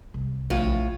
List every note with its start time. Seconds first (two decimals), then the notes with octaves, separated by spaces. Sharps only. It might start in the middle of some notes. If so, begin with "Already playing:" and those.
0.14 C2
0.50 A#1 A2 F4